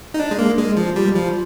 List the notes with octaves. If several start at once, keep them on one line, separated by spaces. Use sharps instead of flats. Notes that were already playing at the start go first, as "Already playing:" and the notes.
D#4
D4
G#3
A#3
G#3
F3
G3
F3